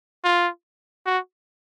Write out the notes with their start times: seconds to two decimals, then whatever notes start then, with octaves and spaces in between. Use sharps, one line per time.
0.24 F4
1.06 F#4